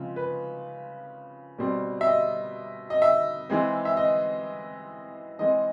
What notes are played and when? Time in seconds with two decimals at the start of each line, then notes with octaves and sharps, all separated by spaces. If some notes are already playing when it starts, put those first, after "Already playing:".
Already playing: C#3 F3 G#3 C4
0.16 B4
1.58 B2 G3 C4
2.01 E5
2.07 D#5
2.90 D#5
3.02 E5
3.50 E3 G#3 C4
3.85 E5
3.97 D#5
5.39 E3 G#3 C4 D#5